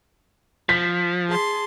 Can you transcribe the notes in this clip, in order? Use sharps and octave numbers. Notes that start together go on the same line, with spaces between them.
F3 B6
G#4 A5 C6